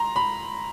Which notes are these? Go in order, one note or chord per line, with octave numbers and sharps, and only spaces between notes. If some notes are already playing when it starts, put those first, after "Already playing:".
Already playing: A#5 C6
B5